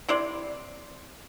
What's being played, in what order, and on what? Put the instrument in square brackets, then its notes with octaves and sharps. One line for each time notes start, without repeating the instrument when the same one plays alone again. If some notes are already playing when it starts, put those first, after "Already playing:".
[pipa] C3 E4 C5 D5